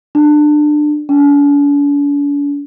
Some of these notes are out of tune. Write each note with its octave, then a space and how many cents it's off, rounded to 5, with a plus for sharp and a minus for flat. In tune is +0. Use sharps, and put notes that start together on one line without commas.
D4 +25
D4 -45